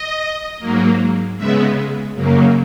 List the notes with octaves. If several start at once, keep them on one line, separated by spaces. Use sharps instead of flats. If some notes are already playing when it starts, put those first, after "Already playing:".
Already playing: D#5
G#2 F#3 A#3
C#3 G#3 B3 E5
F#2 C#3 F#3 A#3